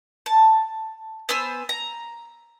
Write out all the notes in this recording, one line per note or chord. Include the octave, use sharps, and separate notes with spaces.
A5
B3 C5 G#5 E6
A#5